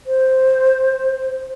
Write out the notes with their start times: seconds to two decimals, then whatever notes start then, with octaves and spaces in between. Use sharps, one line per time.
0.06 C5